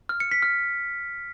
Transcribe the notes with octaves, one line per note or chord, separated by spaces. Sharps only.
F6
C#7
B6
F6